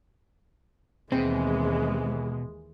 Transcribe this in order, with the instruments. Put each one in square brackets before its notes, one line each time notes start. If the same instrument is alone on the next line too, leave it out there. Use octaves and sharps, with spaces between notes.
[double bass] D#2 E3 [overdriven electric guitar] B2 [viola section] G#3 [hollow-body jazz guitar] C4